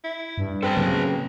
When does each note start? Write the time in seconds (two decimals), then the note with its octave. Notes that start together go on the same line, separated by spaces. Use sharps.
0.04 E4
0.38 G2
0.63 C4 A4 B4 A5
0.77 C#3 F#3 A#3